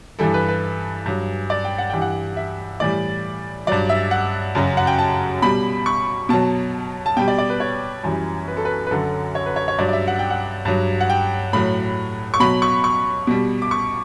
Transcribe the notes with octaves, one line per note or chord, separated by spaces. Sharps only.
G2 E3 G3 A4
B4
B4
G2 F#3
D5
G5
F#5
G2 E3 G3 G5
F#5
E5
A2 E3 G3 D5
G2 F#3 D5
E5
F#5
F#2 C#3 F#3
F#5
G5
A5
B2 G3 B5
C#6
B2 F#3 A5
A5
B2 G3 G5
D5
D5
B4
C#5
F#2 E3 G3
B4
A4
B4
B4
F#2 D3 F#3 A4
C#5
B4
C#5
C#5
G2 F#3 D5
D5
E5
F#5
G5
F#5
G2 F#3
F#5
G5
A2 F#3 B5
C#6
B2 F#3 B5
C#6
C#6
B2 G3
D6
C#6